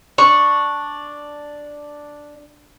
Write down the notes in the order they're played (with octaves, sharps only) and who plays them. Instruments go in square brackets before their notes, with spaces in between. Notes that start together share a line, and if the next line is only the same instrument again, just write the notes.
[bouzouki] D4 [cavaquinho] C#6